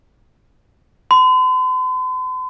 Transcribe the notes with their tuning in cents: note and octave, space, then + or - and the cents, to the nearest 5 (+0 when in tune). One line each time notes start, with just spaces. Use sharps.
C6 -45